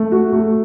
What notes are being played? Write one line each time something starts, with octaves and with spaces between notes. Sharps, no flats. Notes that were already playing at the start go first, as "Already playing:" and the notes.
Already playing: A3
F#4
A3